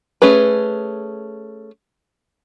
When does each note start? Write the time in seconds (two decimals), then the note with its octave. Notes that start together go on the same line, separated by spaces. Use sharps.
0.22 A3 C#4 G#4 B4